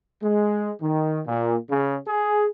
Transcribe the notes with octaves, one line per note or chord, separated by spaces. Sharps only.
G#3
D#3
A#2
C#3
G#4